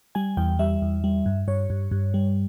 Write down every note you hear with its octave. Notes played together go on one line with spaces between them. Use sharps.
G3 G#5
E2 G5
G3 E5
E2
G3
G2
G2 C#5
G2
G2
G3